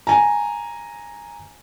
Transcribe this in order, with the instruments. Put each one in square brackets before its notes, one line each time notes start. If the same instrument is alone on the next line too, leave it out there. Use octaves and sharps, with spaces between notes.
[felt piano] G#5 A#5